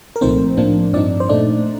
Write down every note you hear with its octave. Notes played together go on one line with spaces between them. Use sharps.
A#4
C2 A#2 F3 A3 C4 D#4 C5
A2 F3 A#3 D4
G2 F3 C4 D4 D#4 D5
C5
A#2 A3 D4 D#4 D5